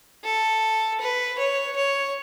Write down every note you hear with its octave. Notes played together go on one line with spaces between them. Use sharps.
A4
B4
C#5
C#5